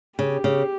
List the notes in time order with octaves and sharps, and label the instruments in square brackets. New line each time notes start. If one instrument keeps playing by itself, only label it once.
[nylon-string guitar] C#3 [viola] G4
[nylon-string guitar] C#3